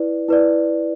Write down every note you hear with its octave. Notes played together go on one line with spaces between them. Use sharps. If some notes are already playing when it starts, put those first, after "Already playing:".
Already playing: E4 B4 D5
E4 B4 D5